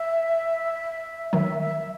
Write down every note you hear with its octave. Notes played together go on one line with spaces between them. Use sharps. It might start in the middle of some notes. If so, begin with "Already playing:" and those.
Already playing: E5
D#3 F#3 E5
E5